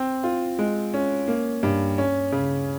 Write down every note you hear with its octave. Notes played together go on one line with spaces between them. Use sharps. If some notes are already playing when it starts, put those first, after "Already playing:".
Already playing: C4
F4
G#3
C#4
A#3
G2
C#4
C#3